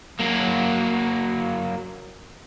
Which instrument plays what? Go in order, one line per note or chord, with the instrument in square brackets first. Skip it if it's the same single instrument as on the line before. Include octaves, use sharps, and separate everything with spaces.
[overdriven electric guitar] F#3 A#3